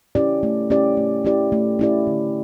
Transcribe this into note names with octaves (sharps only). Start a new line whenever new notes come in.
C#4 E4 G4 D5
A3
C#4 E4 G4 D5
A3
C#4 E4 G4 D5
A3
C#4 E4 G4 D5
D3